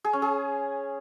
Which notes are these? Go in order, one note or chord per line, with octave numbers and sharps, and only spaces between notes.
G#4
C#4
G#4